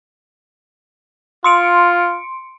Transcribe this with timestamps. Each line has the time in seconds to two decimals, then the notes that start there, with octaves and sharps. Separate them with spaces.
1.44 F4 C6 C#7 D7